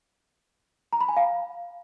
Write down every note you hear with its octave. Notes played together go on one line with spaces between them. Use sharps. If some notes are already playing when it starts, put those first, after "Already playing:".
A#5
B5
G#5
F5